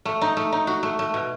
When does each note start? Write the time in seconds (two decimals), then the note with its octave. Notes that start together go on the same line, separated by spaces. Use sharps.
0.05 A3
0.21 D#4
0.37 A3
0.52 D#4
0.67 F#4
0.83 A3
0.99 A3
1.14 B2